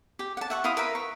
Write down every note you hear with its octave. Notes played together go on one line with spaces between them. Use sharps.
G4
F#5 A5
E5 F#5 C#6
E4 F5 C6 D#6
A#4 B4 E5 B5
C#6